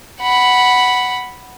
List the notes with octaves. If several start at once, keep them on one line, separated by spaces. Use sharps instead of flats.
F#5 B5